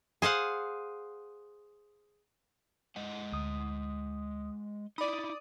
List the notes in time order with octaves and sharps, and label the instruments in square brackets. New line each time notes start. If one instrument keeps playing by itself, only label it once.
[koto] G#4 C5 F5 F#5
[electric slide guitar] G#3 D#5 F#5
[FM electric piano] D2 D#6
[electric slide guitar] D#4 E4 [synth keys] D5 D#6 [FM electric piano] B5